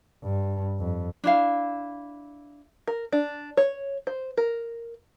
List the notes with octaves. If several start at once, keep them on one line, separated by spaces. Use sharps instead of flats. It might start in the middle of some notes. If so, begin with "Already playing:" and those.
G2
F2
D4 E4 F5
A#4
D4
C#5
C5
A#4